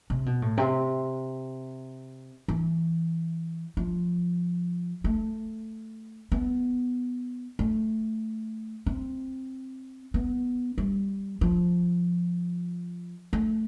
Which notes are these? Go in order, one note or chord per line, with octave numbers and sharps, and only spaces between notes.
C3
B2
A2
C3
E3
F3
A3
B3
A3
C4
B3
G3
F3
A3